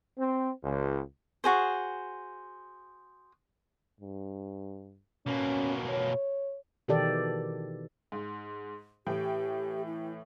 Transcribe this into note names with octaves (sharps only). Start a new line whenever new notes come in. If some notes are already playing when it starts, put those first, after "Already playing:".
C4
C#2
F#4 G#4 C5
G2
B2 A#3 C#4
C#5
B2 D#3 E3 G4 A4 D5
G#2
A2 E3 G4 G5
E4